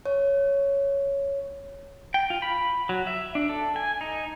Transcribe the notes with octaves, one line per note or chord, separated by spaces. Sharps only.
C#5
G5
F4
B5
F#3
E5
D4
A4
G#5
D#4